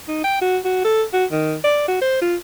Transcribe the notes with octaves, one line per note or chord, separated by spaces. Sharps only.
D#4
G5
F#4
F#4
A4
F#4
D#3
D5
F#4
C5
F4